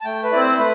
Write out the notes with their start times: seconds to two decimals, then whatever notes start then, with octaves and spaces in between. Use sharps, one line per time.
0.01 A5
0.05 A3 G5
0.23 B4
0.32 C4 E4 D5
0.40 C5
0.58 A3 B4